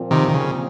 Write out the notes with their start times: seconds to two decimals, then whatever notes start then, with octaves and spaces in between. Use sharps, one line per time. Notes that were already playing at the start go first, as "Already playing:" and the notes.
Already playing: A#2 F3 C4
0.11 C3 D#3
0.28 D#3
0.34 C#3